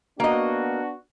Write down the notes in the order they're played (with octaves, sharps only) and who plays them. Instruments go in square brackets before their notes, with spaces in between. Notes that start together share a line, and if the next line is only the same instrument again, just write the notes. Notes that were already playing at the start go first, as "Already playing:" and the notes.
[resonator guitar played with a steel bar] A#3 D#5 [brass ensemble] B3 D4 F#4